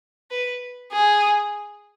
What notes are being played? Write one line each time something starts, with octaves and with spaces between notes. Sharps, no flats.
B4
G#4